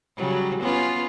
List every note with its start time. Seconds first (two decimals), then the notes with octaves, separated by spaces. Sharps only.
0.17 C#3 F#3 G3
0.61 B3 C#4 F4